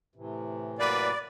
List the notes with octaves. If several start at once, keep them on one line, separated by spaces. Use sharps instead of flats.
A2 C3 E3
F#3 A#3 B4 D5